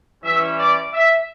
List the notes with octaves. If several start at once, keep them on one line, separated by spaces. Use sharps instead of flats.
E3 G3 C#4 E5
D5
E5